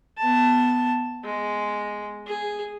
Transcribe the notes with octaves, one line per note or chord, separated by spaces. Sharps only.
B3 A5
G#3
G#4